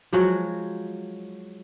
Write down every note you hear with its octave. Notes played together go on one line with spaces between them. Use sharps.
F3 F#3 G#3 F#4